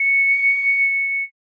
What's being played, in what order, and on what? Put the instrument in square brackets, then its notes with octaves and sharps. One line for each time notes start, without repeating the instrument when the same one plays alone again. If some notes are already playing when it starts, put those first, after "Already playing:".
Already playing: [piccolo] C#7